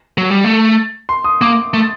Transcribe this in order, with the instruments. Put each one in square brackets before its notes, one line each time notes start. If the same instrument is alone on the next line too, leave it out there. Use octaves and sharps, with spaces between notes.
[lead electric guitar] F#3
G3
A3
[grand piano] C6
D#6
[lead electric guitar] A#3 [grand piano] D6
[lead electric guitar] A3